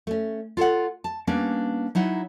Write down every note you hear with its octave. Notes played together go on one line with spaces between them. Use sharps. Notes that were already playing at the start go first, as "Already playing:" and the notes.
A3 C#4
F4 A4 C#5 F#5
A5
G3 A#3 B3 C#4 D4
F#3 D#4 E4 F#5